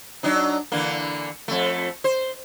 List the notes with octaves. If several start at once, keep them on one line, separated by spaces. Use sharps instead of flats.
F#3 D4 D#4
D3 E3 A#3
F2 A3
C5